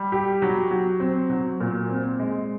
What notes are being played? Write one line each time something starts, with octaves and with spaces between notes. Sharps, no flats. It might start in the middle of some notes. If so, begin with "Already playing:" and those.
Already playing: G3
G4
F#3
F#3
C4
F#3
A#2
C4
G#3